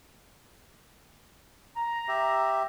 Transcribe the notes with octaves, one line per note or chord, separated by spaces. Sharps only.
A#5
G4 E5